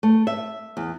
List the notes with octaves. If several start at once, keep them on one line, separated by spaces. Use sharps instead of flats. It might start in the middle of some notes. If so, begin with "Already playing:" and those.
A3
E5
E2